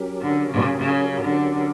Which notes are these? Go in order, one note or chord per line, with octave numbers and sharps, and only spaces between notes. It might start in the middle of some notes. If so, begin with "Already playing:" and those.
Already playing: F#3 C#4 G4 A#4
D3
C#3
C#3
D3